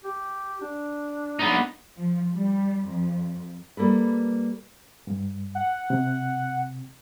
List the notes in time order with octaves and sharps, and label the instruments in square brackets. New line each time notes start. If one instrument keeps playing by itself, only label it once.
[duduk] G4
D4
[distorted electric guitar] B3 D#4
[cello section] F3
G3
F2
[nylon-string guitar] G3 A#3 A4 B4
[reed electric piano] G2
[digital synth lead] F#5
[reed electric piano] C3